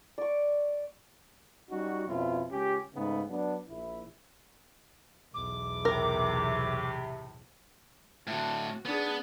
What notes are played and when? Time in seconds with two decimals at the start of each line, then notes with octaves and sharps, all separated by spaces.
0.18 D5 C#6
1.70 G3 C#4 D#4 F#4
2.07 F2 B2 C#4 E4 F4
2.51 C#2 C#4 G4
2.94 G#2 C#3 A3 B3 D#4
3.29 F#3 B3 D4
3.68 A#1 E4
5.34 B1 E2 D6
5.85 A2 C3 A#4
8.27 A2 D3 F#4
8.85 B3 D4 G#4